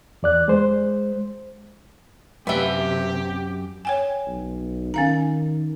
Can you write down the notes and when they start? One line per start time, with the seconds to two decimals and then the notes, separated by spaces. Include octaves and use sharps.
0.23 E2 D5 F#6
0.48 G#3 C5
2.47 F#2 C3 B3 G4 E5 G5
3.85 C#5 G5 G#5
4.27 B1
4.94 D#3 C#4 F5 A#5